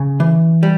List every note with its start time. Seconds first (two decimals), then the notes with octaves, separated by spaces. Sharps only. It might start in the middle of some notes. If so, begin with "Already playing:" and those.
Already playing: C#3
0.20 E3
0.63 G3